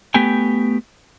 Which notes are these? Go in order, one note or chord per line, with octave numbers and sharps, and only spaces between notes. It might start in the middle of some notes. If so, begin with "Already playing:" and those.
A3 B3 G4 G5 G#5